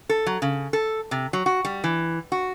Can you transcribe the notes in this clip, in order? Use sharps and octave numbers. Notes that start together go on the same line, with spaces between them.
A4
F#3
C#3
A4
C3
F#3
F#4
G3
E3
F#4